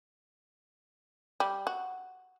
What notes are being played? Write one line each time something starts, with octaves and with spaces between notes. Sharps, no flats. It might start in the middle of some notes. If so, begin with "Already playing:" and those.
G3
F#4